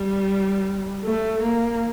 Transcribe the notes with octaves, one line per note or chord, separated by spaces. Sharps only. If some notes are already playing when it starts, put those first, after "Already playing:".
Already playing: G3
A3
A#3